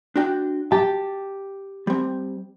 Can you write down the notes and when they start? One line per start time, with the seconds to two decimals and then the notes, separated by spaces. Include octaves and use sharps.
0.16 D4 F#4 G5
0.72 G4 A5
1.87 G3 C4